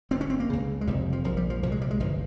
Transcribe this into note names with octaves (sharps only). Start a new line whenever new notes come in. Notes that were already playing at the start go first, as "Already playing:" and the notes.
G1 G2 C4
C#4
C4
A#3
C#2 C#3
G#3
F1 F2 C3 G3
F3
A#1 A#2 F3
G3
F3
C2 A#2 F3
G#3
G3
G#3
G1 F3